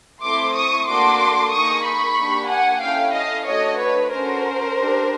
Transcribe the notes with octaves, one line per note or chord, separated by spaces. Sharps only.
A3 C4 E4 C6 D6
C#6 D#6
A#3 D4 F#4 A4 C6 D6
A#3 D#4 G#4 C#6 D#6
B5 C#6
A#3 D4 G4
F#5 G#5
C#4 E4 A4 F5 G5
D#5 F5
A3 D4 F#4 A4 C#5 D#5
B4 C#5
C#4 F#4 A4 A#4 C5
D4 G4